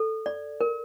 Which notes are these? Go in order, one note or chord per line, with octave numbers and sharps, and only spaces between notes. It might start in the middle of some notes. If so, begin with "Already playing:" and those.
Already playing: A4
D5
A#4